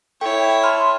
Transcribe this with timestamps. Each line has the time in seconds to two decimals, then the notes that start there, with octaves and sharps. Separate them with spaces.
0.21 E4 A4 C#5 G5
0.63 A5 B5 C6 F6